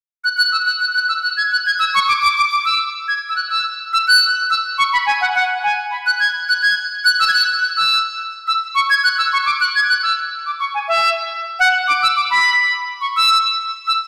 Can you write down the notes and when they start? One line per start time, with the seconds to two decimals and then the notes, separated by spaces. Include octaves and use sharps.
0.24 F#6
0.37 F#6
0.52 E6
0.66 F#6
0.81 F#6
0.95 F#6
1.09 E6
1.22 F#6
1.37 G#6
1.52 F#6
1.66 G#6
1.79 E6
1.94 C#6
2.08 D6
2.22 D6
2.37 D6
2.51 D6
2.65 E6
3.08 G#6
3.29 E6
3.36 F#6
3.50 E6
3.93 E6
4.08 F#6
4.50 E6
4.78 C#6
4.93 B5
5.06 G#5
5.21 F#5
5.35 F#5
5.63 G#5
5.91 B5
6.06 F#6
6.20 G#6
6.49 F#6
6.62 G#6
7.05 F#6
7.20 E6
7.28 G#6
7.33 F#6
7.61 F#6
7.77 E6
8.47 E6
8.75 C#6
8.90 G#6
9.04 F#6
9.18 E6
9.33 C#6
9.46 D6
9.60 F#6
9.76 G#6
9.89 F#6
10.03 E6
10.46 D6
10.60 C#6
10.74 G#5
10.88 E5
11.59 F#5
11.88 D6
12.03 E6
12.16 D6
12.31 B5
13.01 C#6
13.16 E6
13.87 E6